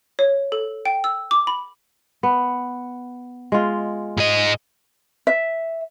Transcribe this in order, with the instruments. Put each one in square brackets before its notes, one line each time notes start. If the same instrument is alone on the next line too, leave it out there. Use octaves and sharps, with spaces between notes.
[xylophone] C#5
A4
G5
E6
D6
B5
[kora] B3
G#3 F4
[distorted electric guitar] G#2 D#5
[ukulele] E5